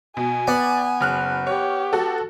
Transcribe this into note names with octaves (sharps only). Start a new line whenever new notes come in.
B2 G#5
B3 D5
F#1 F6 F#6
G4 C#5
F#4 A4